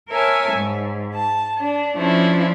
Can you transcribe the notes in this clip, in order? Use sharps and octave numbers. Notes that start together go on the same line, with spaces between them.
A#4 C#5 E5 G#5 A5
G#2
A5
D4
F3 A3 C#4 D4 E4